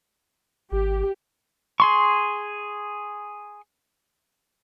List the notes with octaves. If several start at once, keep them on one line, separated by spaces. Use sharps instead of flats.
G#1 G4
G#4 C6 C#6